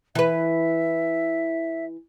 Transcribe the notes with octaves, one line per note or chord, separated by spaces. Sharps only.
E3 B4 E5